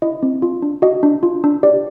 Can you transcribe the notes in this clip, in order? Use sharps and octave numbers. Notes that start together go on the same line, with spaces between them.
E4 D#5
C4
F4
D4
F#4 D#5
D4
F4
D4
G4 D5